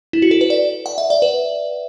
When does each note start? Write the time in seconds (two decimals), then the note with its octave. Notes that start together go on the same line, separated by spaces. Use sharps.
0.13 E4
0.22 F#4
0.31 A4
0.41 B4
0.50 D5
0.86 F#5
0.98 E5
1.10 D5
1.22 B4